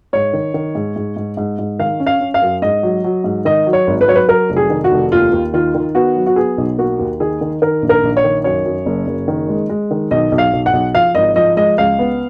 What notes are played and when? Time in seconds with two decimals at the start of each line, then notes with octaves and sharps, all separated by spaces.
0.13 G#2 C#5
0.33 D#3
0.54 D#3
0.75 G#2
0.96 G#2
1.16 G#2
1.37 G#2
1.59 G#2
1.79 D#3 F5
2.00 C#4
2.06 F5
2.21 C#4
2.34 F5
2.42 F#2
2.62 G#2 D#5
2.83 F#3
3.04 F#3
3.24 G#2
3.45 D#3 D#5
3.67 F#3
3.73 C#5
3.87 G#1
4.01 B4
4.08 F#3 C#5
4.15 B4
4.29 F#3 A#4
4.50 F1
4.56 G#4
4.70 D#3
4.84 F#4
4.92 F1
5.12 D#2 F4
5.33 D#2
5.53 D#3 F4
5.74 D#3
5.95 B3 F#4
6.15 F#3
6.26 F#4
6.36 B3 G#4
6.58 B1
6.78 A#3 F#4
6.99 D#2
7.20 D#3 G#4
7.41 D#3
7.62 D#3 A#4
7.82 A#1
7.89 A#4
8.03 A#1
8.17 C#5
8.24 D#3
8.44 F#2 C#5
8.66 F#2
8.86 F#1
9.07 F#1
9.28 D#3
9.48 G#3
9.69 G#3
9.91 D#3
10.11 B1 D#5
10.32 B1
10.38 F5
10.53 B1
10.66 F#5
10.73 B1
10.94 F3 F5
11.15 G#1 D#5
11.36 F3 D#5
11.57 G#3 D#5
11.78 C#2 F5
11.99 B3